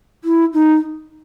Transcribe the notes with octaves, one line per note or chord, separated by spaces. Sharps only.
E4
D#4